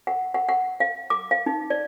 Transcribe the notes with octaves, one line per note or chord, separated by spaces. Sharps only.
F#5
F#5
F#5
F5
D6
F5
D#4
D5